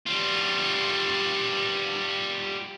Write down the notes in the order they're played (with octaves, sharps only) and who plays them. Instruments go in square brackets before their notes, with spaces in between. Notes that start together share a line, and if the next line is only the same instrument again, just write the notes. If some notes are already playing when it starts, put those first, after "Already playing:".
[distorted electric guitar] G3 F4